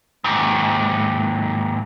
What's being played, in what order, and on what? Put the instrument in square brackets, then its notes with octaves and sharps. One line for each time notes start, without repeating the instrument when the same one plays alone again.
[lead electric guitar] D#2 G#2